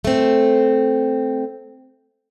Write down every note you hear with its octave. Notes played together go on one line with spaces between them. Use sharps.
A3 C4